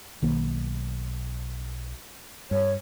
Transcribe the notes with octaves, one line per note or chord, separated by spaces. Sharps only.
B1 D#3 A#3
G2 C#5